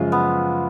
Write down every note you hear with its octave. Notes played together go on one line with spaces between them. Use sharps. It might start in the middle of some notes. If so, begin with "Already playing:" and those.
Already playing: F#2 C#3 F3 G#3 F4
B3